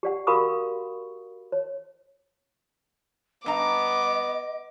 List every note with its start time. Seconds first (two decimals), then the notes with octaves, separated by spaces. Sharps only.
0.03 G4 D5 F#5
0.27 F#4 A#4 F5 B5 C#6 D#6
1.52 C#5
3.46 G2 B3 D#5 A#5 D6